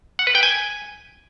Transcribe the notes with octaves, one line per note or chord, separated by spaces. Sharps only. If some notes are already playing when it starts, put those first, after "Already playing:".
F#5
B4
G5
G#5